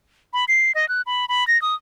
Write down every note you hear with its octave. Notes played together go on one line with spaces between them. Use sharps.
B5
C7
D#5
F#6
B5
B5
A#6
D#6